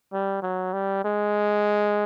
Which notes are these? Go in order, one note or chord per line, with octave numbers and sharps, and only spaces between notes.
G3
F#3
G3
G#3